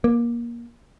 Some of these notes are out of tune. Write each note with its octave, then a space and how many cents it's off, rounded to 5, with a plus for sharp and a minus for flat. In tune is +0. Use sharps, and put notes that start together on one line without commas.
A#3 +20